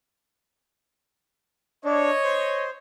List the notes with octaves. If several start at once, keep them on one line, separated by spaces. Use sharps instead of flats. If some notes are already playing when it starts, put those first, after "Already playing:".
D4 C#5 D#5
C5